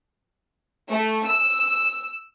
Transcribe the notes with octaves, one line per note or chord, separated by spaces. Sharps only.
A3
E6